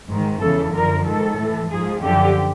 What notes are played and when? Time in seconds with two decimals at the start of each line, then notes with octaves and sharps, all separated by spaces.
0.09 G#2 D#3
0.41 E2 C#3 E3 A4
0.73 F#2 D3 F3 A#4
1.05 G#2 D#3 A4
1.38 A2
1.43 E3
1.70 G#2 F3 G#4
2.02 F#2 D3 F3 G4